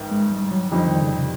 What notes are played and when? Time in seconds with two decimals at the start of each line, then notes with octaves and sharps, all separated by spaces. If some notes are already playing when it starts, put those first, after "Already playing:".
Already playing: A1 G#2 D#3
0.12 G#3
0.31 G3
0.51 F#3
0.71 F2 D3 F3 G3 C4 D#4
0.87 D#3
1.02 C#3
1.17 C3